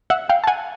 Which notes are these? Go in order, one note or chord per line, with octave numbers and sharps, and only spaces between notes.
E5 F#5
F5 G5
A5
F#5 G#5